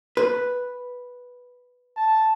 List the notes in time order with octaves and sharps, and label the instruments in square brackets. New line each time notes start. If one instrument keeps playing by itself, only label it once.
[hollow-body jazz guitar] B4
[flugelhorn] A5